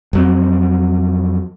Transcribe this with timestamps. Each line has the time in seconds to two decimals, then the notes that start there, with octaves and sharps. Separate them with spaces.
0.13 F2 F#3 C4